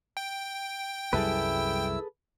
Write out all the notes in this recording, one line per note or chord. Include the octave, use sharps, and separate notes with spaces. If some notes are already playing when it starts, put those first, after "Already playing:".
G5
C2 F#2 G3 E4 G#4 A4 B4 E6